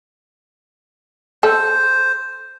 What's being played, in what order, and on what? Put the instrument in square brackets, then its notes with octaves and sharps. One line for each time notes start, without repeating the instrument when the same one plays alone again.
[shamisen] A4 [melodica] C5